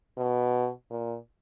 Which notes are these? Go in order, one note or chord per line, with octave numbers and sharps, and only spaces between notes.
B2
A#2